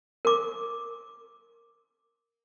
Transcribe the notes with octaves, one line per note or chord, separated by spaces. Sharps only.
A#4 D6